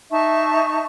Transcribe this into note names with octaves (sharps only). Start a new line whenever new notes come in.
D#4 E5 A5 C#6